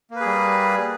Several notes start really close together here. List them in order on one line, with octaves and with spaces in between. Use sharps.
A#3 B4 G#4 G3